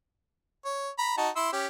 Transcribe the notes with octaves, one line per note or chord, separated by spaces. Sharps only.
C#5
A#5 B5
D#4 F#4 A5
E4 C6 E6
C#4 G4